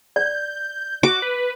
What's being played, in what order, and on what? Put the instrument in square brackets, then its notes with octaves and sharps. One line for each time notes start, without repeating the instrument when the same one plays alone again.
[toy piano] D5 [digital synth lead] G6
[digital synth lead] F#4 [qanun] D6
[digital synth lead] B4